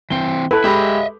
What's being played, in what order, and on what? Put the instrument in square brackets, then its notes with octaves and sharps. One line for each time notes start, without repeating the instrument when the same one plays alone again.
[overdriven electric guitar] E3 C4 [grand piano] G7
[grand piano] E4 [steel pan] A4 B4
[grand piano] G#3 G4 B5 [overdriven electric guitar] D#5 E5